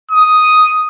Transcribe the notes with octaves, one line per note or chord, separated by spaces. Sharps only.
D#6